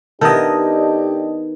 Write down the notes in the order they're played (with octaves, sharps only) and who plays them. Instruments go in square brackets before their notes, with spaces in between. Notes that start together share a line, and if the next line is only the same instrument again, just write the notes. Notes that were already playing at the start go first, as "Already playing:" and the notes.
[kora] D#3 B3 E4 [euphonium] D4 [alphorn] G4 [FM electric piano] A4 D#5